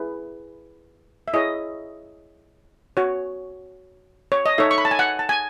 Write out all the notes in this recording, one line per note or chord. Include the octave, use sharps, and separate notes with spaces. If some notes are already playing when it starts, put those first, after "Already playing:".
Already playing: E4 G#4 B4
E5
E4 G#4 C#5 D#5
F#4 C#5
C#5
D#5
D#4 A4 C#5 E5
C#6
B5
A5
G#5
F#5
A5
G#5